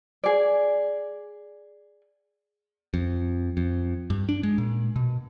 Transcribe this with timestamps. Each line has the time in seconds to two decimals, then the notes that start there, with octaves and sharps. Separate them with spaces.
0.24 G#4 D5
2.94 F2
3.57 F2
4.10 G2
4.29 D4
4.43 G#3
4.58 A#2
4.96 B2